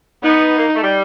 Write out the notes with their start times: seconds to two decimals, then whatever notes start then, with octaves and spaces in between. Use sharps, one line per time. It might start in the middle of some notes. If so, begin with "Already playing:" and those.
0.23 B3 D#4
0.58 A#3
0.75 A3
0.83 G3